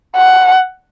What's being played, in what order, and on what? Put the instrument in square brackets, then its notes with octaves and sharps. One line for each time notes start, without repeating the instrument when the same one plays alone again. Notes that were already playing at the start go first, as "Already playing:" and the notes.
[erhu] F#5